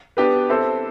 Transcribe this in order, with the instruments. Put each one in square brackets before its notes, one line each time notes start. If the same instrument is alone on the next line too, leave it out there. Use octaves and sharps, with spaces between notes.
[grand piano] B3 D4 G4 B4
C4 E4 A4 C5